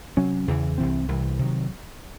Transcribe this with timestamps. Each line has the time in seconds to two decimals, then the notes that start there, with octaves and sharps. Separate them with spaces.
0.17 C3 F#3 C#4
0.48 E2 C#3 E3
0.78 C2 C3 E3 C4
1.08 C2 C3 E3
1.39 C3 D#3 F#3